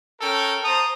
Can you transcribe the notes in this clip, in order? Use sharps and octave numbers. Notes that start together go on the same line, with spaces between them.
C#4 A4 A#4 G5
C5 A5 A#5 D#6